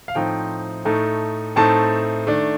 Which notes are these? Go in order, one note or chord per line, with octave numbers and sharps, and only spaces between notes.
F5
A2 F3 C4 D#4 G5
A2 A3 D#4
A2 A3 C4 D#4 A5
D#3 A3 D4